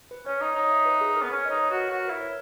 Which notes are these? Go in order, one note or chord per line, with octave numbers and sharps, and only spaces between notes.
B4
C#4 C#5
D#4 D#5
D#4 C#5
D#5
E5
B4
G#4
A#4
B3
C#4 B4
C#5
D#5
D#4 B4
C#5
F#4 A#4
F#4 A#4
A#4
E4 B4
C#5